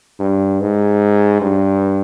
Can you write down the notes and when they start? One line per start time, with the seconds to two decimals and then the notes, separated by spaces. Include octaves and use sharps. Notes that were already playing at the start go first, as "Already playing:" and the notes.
0.19 G2
0.61 G#2
1.41 G2